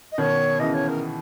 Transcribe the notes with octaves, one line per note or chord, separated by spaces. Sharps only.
D#5
B2 D#3 C#5
C#3 E3 D#5
C#5
A#4